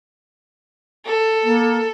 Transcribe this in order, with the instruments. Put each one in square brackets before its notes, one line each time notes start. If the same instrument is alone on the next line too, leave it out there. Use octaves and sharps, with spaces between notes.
[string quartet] A4
[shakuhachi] A#3